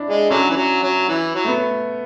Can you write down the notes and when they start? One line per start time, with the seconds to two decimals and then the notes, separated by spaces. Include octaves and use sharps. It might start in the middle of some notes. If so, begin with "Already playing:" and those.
Already playing: D4 E4
0.10 G#3
0.30 D3 F#3 C#4
0.50 E3
0.56 F#3
0.83 F#3
1.09 E3
1.35 F#3
1.44 A3
1.48 B3